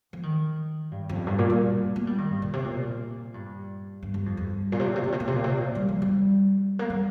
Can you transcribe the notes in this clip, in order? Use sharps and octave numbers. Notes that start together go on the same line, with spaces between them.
F3
D#3
G2
F2
G2
A#2
G3
A#3
G3
D#3
G2
A#2
C3
A#2
G2
G2
G2
F2
G2
A#2
C3
A#2
C3
A#2
C3
A#2
C3
A#2
C3
A#2
G3
F3
G3
A#3
G3